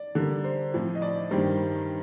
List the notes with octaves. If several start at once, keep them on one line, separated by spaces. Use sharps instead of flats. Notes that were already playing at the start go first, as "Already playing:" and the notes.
Already playing: D5
D3 G3 A#3
C5
A2 F3 C4
D#5
D5
G2 D#3 G3 A#3 C5